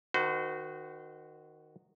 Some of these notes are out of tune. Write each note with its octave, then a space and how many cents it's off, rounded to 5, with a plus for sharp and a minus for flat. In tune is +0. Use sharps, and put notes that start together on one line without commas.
D#3 -15 F#4 +0 C5 -35